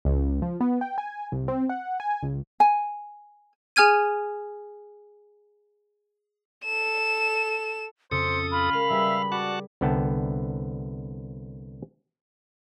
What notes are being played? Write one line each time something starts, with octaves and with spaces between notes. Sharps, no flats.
C#2
F3
B3
G5
G#5
C2
C4
F#5
G#5
C#2
G#5
G#4 G#5 F6 G#6 D#7
A4 E7
F2 C#3 A4 C5 D#6 C#7
F4 B5
G#3 A#4 F5
G3 G#4 B4 E5
F#4 D5 F#5 A5
C2 D3 B3 G5 A5